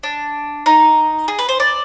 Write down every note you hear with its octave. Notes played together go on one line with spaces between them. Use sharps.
D4
D#4
G#4
B4
C5
D5